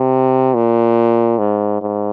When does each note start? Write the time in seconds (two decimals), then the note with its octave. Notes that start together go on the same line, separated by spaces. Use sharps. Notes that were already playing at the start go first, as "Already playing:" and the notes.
Already playing: C3
0.54 A#2
1.39 G#2
1.81 G#2